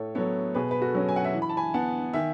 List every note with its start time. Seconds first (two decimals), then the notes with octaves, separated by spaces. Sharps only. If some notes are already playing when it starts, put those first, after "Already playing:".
Already playing: A2 A4 C#5
0.15 F#3 B3 A4 C#5
0.55 B2 G#4 B4
0.71 B4
0.82 F#4 A4
0.95 F#3 C#4
1.09 G#5
1.16 F#5
1.24 E5 G#5
1.35 E3
1.42 B5
1.49 A5
1.57 G#5 B5
1.74 B3 F#5 A5
2.13 D#3 E5 G#5